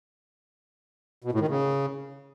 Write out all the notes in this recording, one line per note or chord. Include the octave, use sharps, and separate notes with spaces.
B2
A2
D#3
C#3